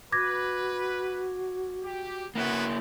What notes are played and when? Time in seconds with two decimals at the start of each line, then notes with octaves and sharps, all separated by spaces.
0.12 F#4 B4 D6 G#6 A#6
1.83 G4
2.35 A#3 B3 E4 F#4 B4